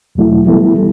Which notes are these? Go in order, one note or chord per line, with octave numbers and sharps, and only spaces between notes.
E2 B2 F#3 A3 E4
E3 G3 B3 E4 A4
E3 G3